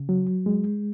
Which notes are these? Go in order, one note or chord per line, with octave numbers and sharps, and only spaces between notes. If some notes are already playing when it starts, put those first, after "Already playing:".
Already playing: C#3
F#3
G#3